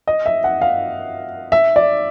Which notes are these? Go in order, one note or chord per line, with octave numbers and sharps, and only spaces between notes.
D#5
E5
F#5
F5
E5
D5